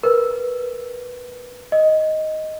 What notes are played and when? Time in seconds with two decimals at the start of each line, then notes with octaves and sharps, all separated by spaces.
0.03 A#4 B4
1.72 D#5